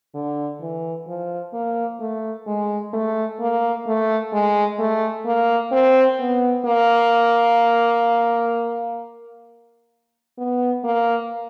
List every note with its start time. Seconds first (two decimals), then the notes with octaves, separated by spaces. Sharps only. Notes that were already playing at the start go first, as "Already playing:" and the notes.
0.14 D3
0.61 E3
1.07 F3
1.53 A#3
2.00 A3
2.47 G#3
2.93 A3
3.40 A#3
3.87 A3
4.32 G#3
4.79 A3
5.26 A#3
5.72 C4
6.19 B3
6.65 A#3
10.38 B3
10.84 A#3